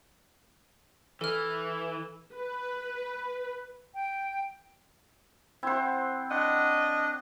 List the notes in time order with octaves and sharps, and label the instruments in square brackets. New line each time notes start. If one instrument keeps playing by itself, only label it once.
[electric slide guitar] E3 [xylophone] A4 F6
[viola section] B4
[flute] G5
[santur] C4 C5 [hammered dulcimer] E4 F#5
[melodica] D4 [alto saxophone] D#5 [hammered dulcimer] F#5